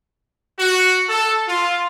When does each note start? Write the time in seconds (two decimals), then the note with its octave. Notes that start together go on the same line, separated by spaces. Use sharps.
0.59 F#4
1.09 A4
1.48 F4